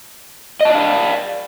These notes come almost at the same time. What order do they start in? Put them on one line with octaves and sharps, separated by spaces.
D#5 A5 D5 F5